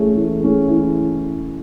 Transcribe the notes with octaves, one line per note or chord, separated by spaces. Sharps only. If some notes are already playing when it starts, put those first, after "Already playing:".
Already playing: E3 A3 C#4 G#4
E3
A3 C#4 G#4
E3